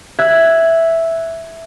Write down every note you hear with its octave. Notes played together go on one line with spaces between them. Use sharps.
E5 F#6 G#6